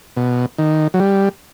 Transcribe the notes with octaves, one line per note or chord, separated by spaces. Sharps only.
B2
D#3
F#3
G3